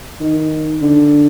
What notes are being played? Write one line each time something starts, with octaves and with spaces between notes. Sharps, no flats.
D#3
D3